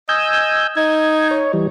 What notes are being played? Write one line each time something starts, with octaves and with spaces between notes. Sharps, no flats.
D#5 G#5 E6 G6
D#4 G#6
C#5
E3 G3